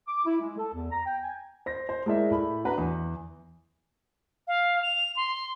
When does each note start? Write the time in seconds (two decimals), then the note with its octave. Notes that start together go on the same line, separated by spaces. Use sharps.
0.08 D6
0.26 E4
0.40 G#3
0.58 A4
0.74 E2
0.92 A#5
1.06 G5
1.23 G#5
1.66 C5 A#6
1.89 C5
2.06 G#3 E4 A#4 D5 E5
2.31 A2 B5
2.65 D4 F#4 B4 A#5
2.78 E2
4.48 F5
4.82 F7
5.16 C6